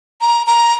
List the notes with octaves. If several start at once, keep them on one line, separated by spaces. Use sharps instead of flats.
A#5
A#5